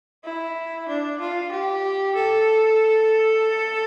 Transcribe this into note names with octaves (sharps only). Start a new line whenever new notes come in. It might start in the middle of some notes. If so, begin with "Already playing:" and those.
E4
D4
F4
G4
A4